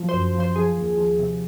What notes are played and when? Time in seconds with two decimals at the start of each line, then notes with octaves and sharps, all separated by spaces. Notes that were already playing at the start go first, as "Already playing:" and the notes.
Already playing: F3 F#3
0.09 C5
0.13 F#2
0.35 F3
0.40 C5
0.56 F3 G#4
0.77 D#2
0.98 F3
1.19 C3